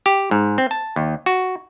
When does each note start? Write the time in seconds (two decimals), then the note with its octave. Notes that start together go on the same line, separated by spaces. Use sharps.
0.06 G4
0.31 G#2
0.58 C4
0.71 A5
0.96 D#2
1.26 F#4